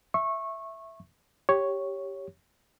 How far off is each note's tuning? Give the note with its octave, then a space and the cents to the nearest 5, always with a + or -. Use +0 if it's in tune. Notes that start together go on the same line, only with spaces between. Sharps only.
E5 +0 C#6 -20
G4 +0 C#5 +0